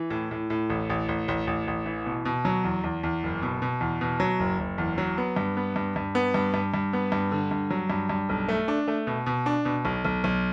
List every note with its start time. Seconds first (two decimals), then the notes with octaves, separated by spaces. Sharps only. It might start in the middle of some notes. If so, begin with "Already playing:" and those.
Already playing: E3
0.10 A2
0.31 A2
0.50 A2
0.70 A1
0.90 A1
1.09 A1
1.28 A1
1.47 A1
1.67 A1
1.86 E3
2.06 B2
2.25 B2
2.45 F#3
2.64 E2
2.84 E2
3.03 E2
3.23 F#1
3.42 B2
3.62 B2
3.81 E2
4.01 B2
4.20 F#3
4.39 F#1
4.59 F#1
4.78 E2
4.98 F#3
5.18 B3
5.36 G2
5.57 B3
5.76 G2
5.96 G2
6.15 B3
6.34 G2
6.54 G2
6.74 G2
6.93 B3
7.12 G2
7.32 D3
7.51 G2
7.70 F#3
7.90 G2
8.09 G2
8.29 B1
8.48 A3
8.68 D4
8.88 A3
9.07 B2
9.26 B2
9.46 D4
9.65 B2
9.85 B1
10.05 B1
10.24 B1